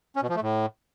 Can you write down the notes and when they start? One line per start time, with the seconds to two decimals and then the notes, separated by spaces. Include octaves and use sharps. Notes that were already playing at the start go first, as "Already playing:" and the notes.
0.16 C#4
0.23 B2
0.29 F3
0.36 A3
0.42 A2